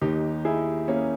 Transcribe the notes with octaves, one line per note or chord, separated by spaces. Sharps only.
D#2 D#3 D#4 G4
E4 G#4
A#3 C#4